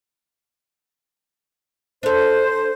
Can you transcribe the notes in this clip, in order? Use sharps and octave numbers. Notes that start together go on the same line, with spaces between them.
D4 A4 C5